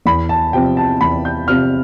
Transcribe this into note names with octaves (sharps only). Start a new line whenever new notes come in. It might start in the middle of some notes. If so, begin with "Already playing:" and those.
E2 B5
A5
C3 F3 C4 F4 G5
A5
E2 B5
G6
C3 F3 C4 F4 F6